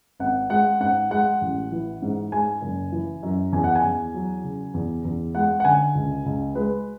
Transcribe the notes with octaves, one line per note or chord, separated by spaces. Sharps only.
G#1 F#5
G#3 F#5
G#2 F#5
G#3 F#5
A1
E3
G#2
G#3 G#5
F#1
E3
F#2
E2 G#5
F#5
G#5
E2
F#3
C#3
E2
E2
G#3 F#5
F#5
D3 G#5
C#2
C#2
G#3 B4